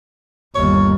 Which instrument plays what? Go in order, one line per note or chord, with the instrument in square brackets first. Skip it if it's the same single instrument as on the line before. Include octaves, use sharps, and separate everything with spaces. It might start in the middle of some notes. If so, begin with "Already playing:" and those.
[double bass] G1 D#2 [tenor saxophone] C#5